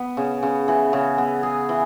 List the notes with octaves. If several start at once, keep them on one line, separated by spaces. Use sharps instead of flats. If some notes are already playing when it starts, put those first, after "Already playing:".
Already playing: B3
C#3
C#3
E3
C#3
B3
G#4
E3